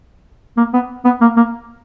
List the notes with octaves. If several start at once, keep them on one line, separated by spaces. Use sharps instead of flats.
A#3
B3
B3
A#3
A#3